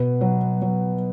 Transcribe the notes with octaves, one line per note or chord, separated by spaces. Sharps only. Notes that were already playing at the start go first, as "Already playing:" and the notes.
Already playing: B2 B4
F#3
F#3